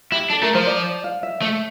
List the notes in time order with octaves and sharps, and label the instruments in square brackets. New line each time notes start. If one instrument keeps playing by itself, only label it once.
[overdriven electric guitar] E4 [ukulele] G4
[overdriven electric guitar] D4 [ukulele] A4
[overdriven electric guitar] A3 [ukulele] A#4
[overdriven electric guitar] F3 [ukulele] C5
[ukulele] D5
F5
E5
[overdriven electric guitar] A3 [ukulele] E5